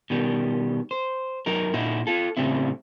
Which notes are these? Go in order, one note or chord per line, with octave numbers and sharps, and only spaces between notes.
B2 D#3 G3
C5
F#3 D#4 A#4
A#2 D#4 E4 F#4
F4 A4
A2 C#3 G3 C4 E4